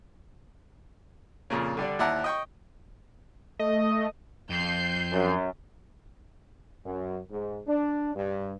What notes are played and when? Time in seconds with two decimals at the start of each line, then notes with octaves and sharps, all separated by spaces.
1.50 F2 A#2 C#3
1.77 D3 G3 D4
1.99 D#2 E4 D5 F#5 A5 A#5
2.24 D#5 G5 C#6
3.59 A3 D#5
4.50 F2 G6 C7
5.11 F#2
6.85 F#2
7.31 G#2
7.67 D4
8.15 G2